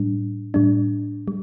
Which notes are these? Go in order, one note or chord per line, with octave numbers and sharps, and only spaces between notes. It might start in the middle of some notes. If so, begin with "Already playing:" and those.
Already playing: A2 G3 D4
A2 G3 D4
G3